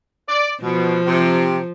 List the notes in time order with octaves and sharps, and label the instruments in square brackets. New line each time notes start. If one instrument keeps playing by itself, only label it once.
[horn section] D5
[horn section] B2 [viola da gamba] F3
[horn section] C3